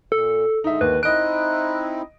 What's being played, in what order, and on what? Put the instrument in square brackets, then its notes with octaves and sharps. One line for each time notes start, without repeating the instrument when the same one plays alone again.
[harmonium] A#2 [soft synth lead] A4
[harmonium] D3 G#3 [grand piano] D#4 E5
[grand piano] D#2 [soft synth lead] B4
[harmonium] C4 D#4 E4 [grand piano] D#5 D7 [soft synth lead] F#6